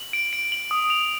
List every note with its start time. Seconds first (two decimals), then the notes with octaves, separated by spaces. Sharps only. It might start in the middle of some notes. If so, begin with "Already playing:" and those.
Already playing: F#7
0.13 D7
0.33 D7
0.52 F#7
0.71 D#6
0.90 F7